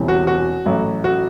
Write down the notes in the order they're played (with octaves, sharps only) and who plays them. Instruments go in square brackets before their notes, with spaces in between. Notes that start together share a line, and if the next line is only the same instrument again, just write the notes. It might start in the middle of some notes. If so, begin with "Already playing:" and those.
Already playing: [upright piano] E1 E2 C3 G3
F#4
F#4
A1 A2 F#3 A3
F#4